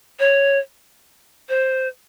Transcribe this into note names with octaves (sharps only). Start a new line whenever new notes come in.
C#5
C5